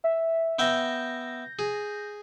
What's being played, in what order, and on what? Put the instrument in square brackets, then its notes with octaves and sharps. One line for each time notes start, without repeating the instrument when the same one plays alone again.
[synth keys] E5
[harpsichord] B3 E5 G5 [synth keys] G6 A#6
[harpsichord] G#4